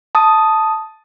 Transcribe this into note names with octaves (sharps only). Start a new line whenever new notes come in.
A5 D#6